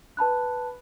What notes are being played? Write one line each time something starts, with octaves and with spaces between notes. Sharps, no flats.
B4 A5 B5 F#6